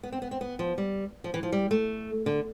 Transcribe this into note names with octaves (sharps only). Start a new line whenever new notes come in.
B3
C4
B3
C4
B3
F3
G3
F3
E3
F3
G3
A3
D3